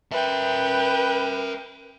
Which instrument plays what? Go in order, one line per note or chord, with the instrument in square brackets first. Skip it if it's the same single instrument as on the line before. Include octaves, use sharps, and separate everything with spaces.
[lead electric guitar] A#4 E5 [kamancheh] B4 G5